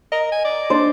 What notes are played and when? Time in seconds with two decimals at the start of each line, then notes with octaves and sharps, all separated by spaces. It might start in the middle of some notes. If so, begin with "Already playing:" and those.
0.12 A#4 D#5
0.32 G#5
0.44 D5
0.70 D4 C5